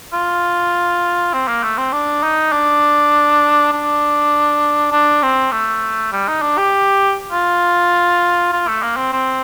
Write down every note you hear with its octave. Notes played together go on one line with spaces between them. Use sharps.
F4
C4
A#3
A3
C4
D4
D#4
D4
D4
D4
C4
A3
G3
D#4
D4
G4
F4
F4
A3
A#3
C4
C4